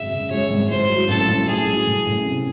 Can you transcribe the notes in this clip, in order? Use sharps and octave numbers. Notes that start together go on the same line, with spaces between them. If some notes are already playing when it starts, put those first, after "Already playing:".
Already playing: G#1 F#2 C#3 G#3 E5
C#3
G#3 C#5
G#1
A2 C5
F#3
A1 A4
A1
A2 G#4
F#3
A1
A1
C3